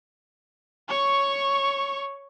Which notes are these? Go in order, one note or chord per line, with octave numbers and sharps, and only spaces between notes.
C#5 C#6